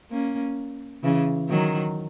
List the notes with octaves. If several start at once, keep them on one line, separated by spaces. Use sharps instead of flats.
A#3 C#4
C#3 E3
D#3 F#3